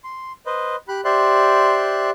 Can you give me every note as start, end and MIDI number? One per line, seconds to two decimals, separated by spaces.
0.04 0.32 84
0.46 0.76 71
0.46 0.76 72
0.46 0.76 75
0.88 1.01 67
0.88 1.01 83
0.88 1.01 90
1.05 2.10 67
1.05 2.10 72
1.05 2.10 74
1.05 2.10 76
1.05 2.10 84
1.05 2.10 90